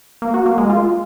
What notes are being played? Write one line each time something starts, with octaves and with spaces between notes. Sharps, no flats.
A#3
F#4
A#3
G#3
F4